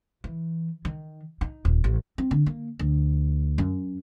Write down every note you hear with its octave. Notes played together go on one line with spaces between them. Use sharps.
E3
D#3
D#4
D#1
A1
C4
D3
A#3
D2
F#2